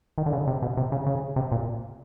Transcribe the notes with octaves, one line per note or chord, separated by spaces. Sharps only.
D#3
D3
C#3
C3
B2
C3
C#3
C#3
C3
A#2